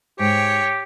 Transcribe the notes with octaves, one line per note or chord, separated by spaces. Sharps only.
G#2 G4 C#5 G5